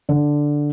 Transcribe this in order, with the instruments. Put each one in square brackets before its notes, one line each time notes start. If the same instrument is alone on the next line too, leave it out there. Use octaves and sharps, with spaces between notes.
[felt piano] D3